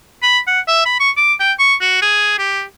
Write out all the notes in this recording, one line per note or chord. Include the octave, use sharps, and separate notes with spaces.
B5
F#5
E5
B5
C#6
D6
G5
C#6
F#4
G#4
G4